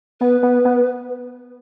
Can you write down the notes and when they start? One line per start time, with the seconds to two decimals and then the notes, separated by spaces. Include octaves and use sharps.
0.21 B3 B4
0.43 B3
0.65 B3